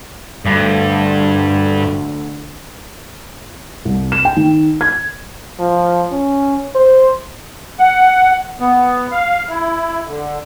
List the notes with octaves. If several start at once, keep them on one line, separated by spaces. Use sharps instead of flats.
D2 G2 D3
C2
E7
G5
D#3
G#6
F3
C#4
C5
F#5
B3
F5
E4
D3